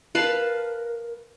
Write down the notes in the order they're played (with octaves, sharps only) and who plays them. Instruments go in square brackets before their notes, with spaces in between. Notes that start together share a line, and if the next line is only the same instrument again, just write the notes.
[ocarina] A#4 [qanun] B4 F5 A5